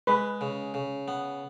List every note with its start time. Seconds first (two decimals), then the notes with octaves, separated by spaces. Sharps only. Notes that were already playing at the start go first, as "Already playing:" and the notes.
0.07 G#3 B4
0.41 C#3
0.74 C#3
1.08 B3